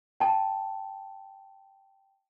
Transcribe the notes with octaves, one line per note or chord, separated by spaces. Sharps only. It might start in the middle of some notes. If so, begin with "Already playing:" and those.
G5 A5